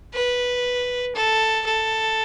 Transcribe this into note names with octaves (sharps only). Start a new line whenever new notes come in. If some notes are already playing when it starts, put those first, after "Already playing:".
B4
A4
A4